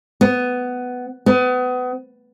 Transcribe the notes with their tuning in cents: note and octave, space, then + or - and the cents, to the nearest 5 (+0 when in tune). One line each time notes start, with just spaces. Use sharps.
B3 +10
B3 +30